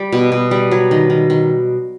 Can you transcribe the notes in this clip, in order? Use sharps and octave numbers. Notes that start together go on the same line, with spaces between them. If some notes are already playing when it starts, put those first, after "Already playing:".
Already playing: G3
B2
B2
G3
F#3
D#3
D#3
D#3